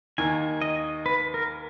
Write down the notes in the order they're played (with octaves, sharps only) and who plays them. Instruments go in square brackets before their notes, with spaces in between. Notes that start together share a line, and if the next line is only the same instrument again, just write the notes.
[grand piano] D#2 D#3 A#3 [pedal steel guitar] G#5
[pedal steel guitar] D#5
B4
A#4